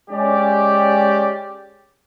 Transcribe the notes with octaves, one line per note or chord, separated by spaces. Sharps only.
G#3 C#4 G4 D5